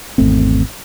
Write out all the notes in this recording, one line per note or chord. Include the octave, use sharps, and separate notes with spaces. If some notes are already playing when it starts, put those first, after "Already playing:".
G#1 E2 A3 C4